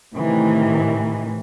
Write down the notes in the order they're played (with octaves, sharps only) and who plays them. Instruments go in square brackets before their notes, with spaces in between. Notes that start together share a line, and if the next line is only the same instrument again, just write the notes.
[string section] A2 C3 D#3 E3